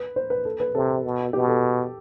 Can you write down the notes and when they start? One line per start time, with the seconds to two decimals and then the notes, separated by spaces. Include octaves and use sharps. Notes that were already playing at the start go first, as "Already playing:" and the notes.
Already playing: B4
0.16 C5
0.30 B4
0.45 A4
0.60 B4
0.75 C3 A4
1.05 B2
1.33 B2 G4
1.48 A4